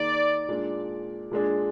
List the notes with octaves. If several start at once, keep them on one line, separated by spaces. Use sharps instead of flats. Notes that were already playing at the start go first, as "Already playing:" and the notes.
Already playing: D#3 A#3 D#4 G#4 D5
A#2 G#3 D4
A#2 G#3 D4 G#4